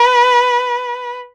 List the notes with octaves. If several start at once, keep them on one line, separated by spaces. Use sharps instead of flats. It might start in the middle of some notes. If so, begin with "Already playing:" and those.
Already playing: B4